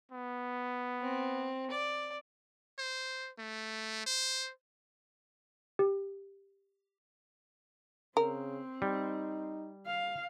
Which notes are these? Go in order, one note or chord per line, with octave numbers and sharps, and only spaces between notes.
B3
C4
D5
C5
A3
C5
G4
C#3 C4 A#4
G3 D#4
F5